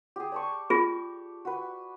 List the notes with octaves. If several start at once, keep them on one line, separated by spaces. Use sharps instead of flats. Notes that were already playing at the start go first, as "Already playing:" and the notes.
G4 G#4
D5 A5 C#6
F4 G#4
F#4 B4